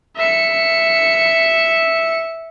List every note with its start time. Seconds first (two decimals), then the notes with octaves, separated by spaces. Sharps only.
0.16 E5 C#7